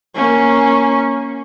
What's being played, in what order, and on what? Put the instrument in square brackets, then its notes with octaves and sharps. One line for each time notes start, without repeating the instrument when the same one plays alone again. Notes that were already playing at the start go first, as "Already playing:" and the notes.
[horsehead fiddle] A#3 C#4